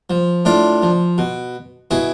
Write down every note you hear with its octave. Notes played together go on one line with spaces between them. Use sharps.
F3
A2 D4 F4
F3
B2
B2 E4 G#4